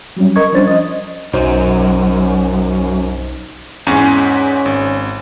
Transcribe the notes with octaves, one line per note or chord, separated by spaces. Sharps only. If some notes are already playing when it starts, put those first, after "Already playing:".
F#3 G3 C#4
A#4 D#5 C#6 G#6
F3 G3 C#4 D4 C5 A6
D#5
B1 F#2 D#4 C5
E2 G#2 C#4
G#1